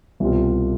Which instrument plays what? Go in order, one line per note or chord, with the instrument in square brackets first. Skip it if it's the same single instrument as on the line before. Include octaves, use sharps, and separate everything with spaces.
[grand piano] C2 B2 G3 C4 F4